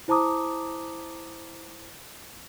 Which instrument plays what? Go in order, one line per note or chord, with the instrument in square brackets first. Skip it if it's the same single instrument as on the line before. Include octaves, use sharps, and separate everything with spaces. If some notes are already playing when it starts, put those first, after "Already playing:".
[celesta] E4 C5 A5 A#5 D6 D#6